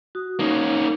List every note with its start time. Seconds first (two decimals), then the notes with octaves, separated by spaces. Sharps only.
0.15 F#4 D#6
0.39 A#3 C#4 D#4